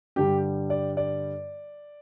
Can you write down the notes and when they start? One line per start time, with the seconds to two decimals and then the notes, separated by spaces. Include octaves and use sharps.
0.16 G2 D3 G3 G4
0.70 D5
0.97 D5